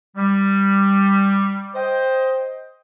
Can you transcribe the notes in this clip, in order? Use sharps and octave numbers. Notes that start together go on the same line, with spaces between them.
G3
C5 D#5 G5